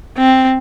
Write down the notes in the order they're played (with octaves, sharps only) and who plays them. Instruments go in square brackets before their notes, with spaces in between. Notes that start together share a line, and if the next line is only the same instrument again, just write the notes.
[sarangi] C4